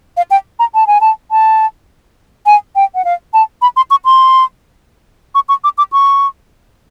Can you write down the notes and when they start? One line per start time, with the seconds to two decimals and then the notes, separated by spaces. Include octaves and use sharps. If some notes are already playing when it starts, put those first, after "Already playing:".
0.17 F5
0.31 G5
0.59 A#5
0.74 A5
0.87 G#5
1.01 A5
1.31 A5
2.46 G#5
2.75 G5
2.95 F#5
3.04 F5
3.34 A5
3.62 B5
3.76 C6
3.91 C#6
4.05 C6
5.35 C#6
5.49 C#6
5.64 D6
5.78 D6
5.92 C#6